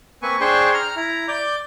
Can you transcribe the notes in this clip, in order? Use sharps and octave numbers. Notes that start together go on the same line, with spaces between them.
A#3 C4 B4 G#5 C#6
D4 G#4 C5 G5 C6 C#6
A#5 F6
E4 A#5
D5 D6 G6